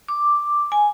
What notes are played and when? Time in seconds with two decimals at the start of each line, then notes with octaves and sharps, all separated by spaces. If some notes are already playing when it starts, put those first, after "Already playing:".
0.08 D6
0.72 G#5